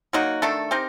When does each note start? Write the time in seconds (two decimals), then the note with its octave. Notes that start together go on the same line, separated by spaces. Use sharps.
0.13 F#3 A#3 D#4 F#4
0.42 D#3 A3 D4 A4
0.71 C4 D#4 G4 A#4